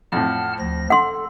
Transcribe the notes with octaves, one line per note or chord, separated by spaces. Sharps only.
F2 A2 F#5 A5 F6
D2 F3 A#6
A4 F#5 C6